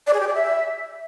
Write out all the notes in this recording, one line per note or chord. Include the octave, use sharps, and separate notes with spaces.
D5
G#4
G4
D5
E5